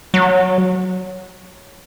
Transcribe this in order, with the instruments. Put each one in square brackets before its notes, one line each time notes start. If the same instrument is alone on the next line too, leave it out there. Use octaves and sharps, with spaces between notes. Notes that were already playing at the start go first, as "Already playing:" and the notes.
[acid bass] F#3